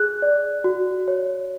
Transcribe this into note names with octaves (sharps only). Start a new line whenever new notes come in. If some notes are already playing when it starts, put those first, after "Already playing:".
Already playing: G#4 F#6
D5
F#4
C#5